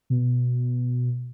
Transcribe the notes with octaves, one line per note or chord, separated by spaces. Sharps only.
B2